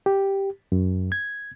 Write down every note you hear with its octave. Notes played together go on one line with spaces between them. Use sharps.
G4
F#2
G#6